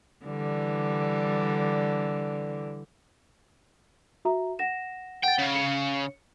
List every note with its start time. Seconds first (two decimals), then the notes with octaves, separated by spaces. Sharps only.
0.25 D3 E3 G3
4.25 F#4 E5 A#5
4.59 F#5 A#6 E7
5.24 F#5 G5 A6
5.39 C#3
5.55 C#7